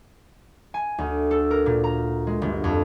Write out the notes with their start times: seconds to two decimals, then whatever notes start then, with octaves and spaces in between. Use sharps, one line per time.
0.74 G#5
0.98 D2
1.31 A4
1.51 A#4
1.66 A#2
1.84 A#5
2.27 G#3
2.42 G1
2.64 F2